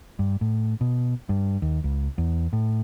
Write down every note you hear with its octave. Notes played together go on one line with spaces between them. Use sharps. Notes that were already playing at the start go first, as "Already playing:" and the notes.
G2
A2
B2
G2
D#2
C#2
E2
A2